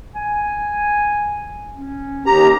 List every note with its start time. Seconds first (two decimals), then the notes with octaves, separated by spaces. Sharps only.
0.15 G#5
1.75 C#4
2.26 D#2 G4 A#5